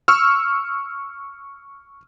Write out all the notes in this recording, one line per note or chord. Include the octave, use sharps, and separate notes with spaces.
C#6 E6 F6